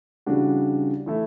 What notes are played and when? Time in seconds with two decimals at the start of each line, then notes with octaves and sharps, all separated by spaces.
0.26 C#3 E3 G3 D4 F#4
1.06 E3 A3 E4